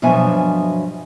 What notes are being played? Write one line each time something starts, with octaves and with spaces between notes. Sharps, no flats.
G2 B2 F3 F#3 E5 G#5